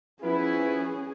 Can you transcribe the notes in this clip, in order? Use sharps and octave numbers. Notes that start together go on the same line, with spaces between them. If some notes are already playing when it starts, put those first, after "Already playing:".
F3 B3 C#4 E4 G#4 B4